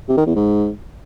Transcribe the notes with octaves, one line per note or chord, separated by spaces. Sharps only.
C3
D#3
E2
G#2